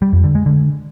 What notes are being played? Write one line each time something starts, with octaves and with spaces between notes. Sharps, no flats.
G3
F2
D3
G#3
D3